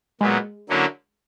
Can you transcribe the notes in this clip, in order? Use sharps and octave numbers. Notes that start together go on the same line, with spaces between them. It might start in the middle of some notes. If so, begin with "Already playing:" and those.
A#2 F#3 G#3 B3
D3 F#3 A#3 C#4 E4